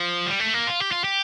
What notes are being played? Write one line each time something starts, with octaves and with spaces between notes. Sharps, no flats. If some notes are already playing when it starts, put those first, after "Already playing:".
Already playing: F3
G3
A3
A#3
F4
G4
F4
G4